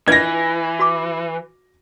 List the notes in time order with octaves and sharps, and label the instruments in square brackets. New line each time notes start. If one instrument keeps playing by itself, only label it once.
[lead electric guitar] E3 [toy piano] F4 B4 D#5 [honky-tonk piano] G#6 A#6
[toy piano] F#4 B5 D6